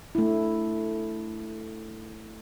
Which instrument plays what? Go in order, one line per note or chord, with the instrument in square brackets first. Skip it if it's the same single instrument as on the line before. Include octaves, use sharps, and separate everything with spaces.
[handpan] A3 D4 E4